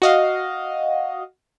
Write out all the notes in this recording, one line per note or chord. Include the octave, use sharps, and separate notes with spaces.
F#4 D#5 F5